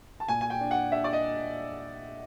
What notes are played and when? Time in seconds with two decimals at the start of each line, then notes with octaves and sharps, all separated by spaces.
0.20 A5
0.28 A#2 G#5
0.41 G#5
0.50 G5
0.61 D4
0.71 F#5
0.92 D4 E5
1.04 D5
1.13 D#5